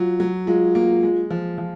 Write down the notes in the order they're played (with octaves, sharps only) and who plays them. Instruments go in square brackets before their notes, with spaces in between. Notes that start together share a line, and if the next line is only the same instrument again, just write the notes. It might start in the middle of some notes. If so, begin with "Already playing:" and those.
Already playing: [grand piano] F#3 [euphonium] F4
[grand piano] F#3
[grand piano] G#3 [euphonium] F4
[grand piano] A#3
G#3
F3
F3